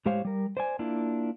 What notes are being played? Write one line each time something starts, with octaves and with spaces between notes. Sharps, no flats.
A2 G#3 G4 C5 C#5 F5
G3 A#4
C5 D5 G#5
A#3 D4 E4 F4